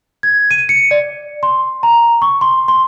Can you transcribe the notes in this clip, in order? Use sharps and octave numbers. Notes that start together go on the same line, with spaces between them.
G#6
D#7
C#7
D5
C6
A#5
C#6
C6
C6